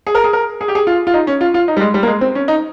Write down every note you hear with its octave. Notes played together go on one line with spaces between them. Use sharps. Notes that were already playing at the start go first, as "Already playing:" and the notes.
G#4
A#4
G#4
A#4
G#4
G4
G#4
F4
F4
D#4
C#4
F4
F4
D#4
G3
G#3
G3
A#3
G#3
C4
C#4
D#4